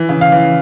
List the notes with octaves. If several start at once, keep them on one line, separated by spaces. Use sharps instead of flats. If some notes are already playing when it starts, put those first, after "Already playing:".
Already playing: E3
C#3
F5
E3